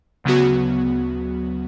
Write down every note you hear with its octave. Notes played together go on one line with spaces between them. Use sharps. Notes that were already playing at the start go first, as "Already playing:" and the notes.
D2 C#3 F#3 B3 F#4